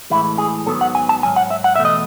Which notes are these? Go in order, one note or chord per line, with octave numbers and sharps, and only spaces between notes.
A2 E3 G#3 E4
G#4
G#2 D#3 F#3 B3 A4
F#5
G#5
A5
G#2 F#3 G#5
F#5
E5
F#5
E2 B2 A3 E5
D#5